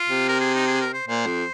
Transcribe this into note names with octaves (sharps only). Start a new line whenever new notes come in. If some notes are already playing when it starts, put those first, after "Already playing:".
Already playing: F4
C3
A#4
G#4
D#4
G#4
A#4
C5
A#2 C5
F2